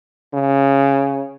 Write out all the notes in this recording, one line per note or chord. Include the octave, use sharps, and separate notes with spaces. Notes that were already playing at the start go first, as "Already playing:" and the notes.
C#3